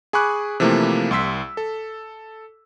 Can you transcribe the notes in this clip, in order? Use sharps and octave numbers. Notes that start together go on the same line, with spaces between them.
G#4 G#5 B5 C#6 D6 F#6
C3 E3 F3 A3 A#3 E4
C2 C6 E6 B6
A4